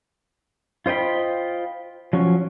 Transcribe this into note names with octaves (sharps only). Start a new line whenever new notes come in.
F4 C5 D#5 G5 B5
F3 F#3 C#4 F#4